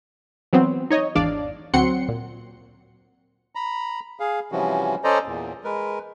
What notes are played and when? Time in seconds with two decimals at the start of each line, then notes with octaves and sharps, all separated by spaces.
0.53 E3 F#3 B3 C4
0.90 D#4 C#5 D#5
1.15 G#1 E2 D4 D5 F5
1.74 D2 F#3 C4 F#5 C6 C#7
2.08 A#2
3.55 A#5 B5
4.20 G#4 F5
4.52 C3 E3 F3 G3 C#4 F#4
5.04 C#4 A4 C5 D5 D#5 A#5
5.27 E2 A#2
5.64 G#3 A#4 B4